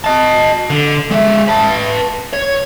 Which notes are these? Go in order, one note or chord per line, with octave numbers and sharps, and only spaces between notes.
D#5 A5
D3
G#3 E5
B4 A5
C#5